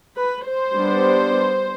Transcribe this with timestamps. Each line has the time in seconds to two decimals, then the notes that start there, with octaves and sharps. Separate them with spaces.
0.17 B4
0.47 C5
0.76 G3 B3 D4